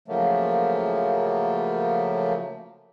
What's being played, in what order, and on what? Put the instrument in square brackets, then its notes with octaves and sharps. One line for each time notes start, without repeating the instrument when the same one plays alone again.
[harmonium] C#3 F3 F#3 A3 A#3